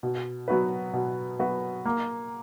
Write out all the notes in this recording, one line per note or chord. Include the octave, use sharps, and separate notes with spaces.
B2
F#3 B3 F#4 B4
B2
F#3 B3 F#4 B4
A#3